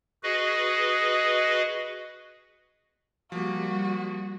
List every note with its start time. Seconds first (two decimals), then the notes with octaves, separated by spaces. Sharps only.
0.23 F#4 G#4 B4 D#5
3.32 F3 G3 A#3 F#4